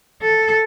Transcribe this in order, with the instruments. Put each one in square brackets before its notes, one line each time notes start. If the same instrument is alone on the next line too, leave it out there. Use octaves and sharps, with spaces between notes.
[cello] A4